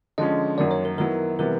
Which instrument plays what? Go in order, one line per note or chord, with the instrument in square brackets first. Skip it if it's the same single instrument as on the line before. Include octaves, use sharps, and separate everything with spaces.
[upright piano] D3 F3 G#3 C#4 [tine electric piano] D#5
[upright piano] F#2 D#3 F#3 A#3 [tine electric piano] D5
[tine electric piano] C#5
A#4
[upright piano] D#3 F#3 B3 E4 [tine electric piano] A#4
[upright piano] C3 E3 G3 B3 [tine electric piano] A#4